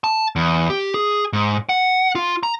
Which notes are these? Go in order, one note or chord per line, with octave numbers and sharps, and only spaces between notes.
A5
E2
G4
G#4
G#2
F#5
F4
A#5